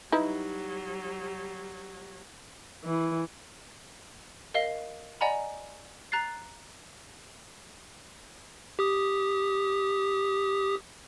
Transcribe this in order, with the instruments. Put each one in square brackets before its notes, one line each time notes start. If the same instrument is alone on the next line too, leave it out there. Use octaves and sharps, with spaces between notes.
[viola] F#3 G3 [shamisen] D#4 E4 B4
[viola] E3
[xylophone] A#4 D#5 F5 C7 G7
D5 D#5 F#5 G#5 A#5 B5
A#5 F#6 A6 C7
[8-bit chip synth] G4 D#6